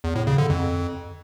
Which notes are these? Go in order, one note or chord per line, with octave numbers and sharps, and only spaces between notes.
E2
A2
C#3
D3
F2